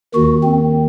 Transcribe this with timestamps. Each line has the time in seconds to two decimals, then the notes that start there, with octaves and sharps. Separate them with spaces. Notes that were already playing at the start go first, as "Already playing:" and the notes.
0.14 D#2 D#3 F#4
0.44 C4